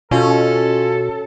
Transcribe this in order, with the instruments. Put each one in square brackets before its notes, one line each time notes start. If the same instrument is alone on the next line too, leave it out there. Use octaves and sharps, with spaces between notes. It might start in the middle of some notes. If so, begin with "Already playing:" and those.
[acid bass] B2 [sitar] C#4 [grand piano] F4 [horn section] A4